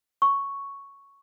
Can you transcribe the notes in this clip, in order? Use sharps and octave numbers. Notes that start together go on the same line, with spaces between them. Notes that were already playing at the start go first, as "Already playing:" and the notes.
C#6